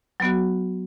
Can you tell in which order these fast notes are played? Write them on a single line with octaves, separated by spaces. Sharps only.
F#3 B3 F#4